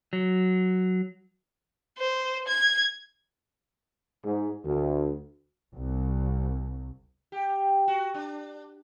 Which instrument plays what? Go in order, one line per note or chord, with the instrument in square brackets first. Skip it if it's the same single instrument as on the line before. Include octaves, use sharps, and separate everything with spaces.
[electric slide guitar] F#3
[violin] C5
G#6
[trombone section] G#2
D2
[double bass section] C2
[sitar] G4
F#4
D4